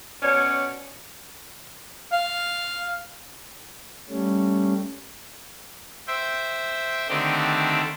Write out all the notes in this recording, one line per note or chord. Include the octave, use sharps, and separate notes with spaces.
B2 C#4 C#5 D5
F5
G3 A3 C#4
C5 E5 G5
D3 D#3 A3 C4 D4 G4